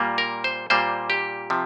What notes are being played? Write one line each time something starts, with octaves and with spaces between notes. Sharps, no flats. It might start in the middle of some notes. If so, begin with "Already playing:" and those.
Already playing: A#2 G3 A#3
A#4
C5
A#2 G3 A#3 C5
G4
C3 F3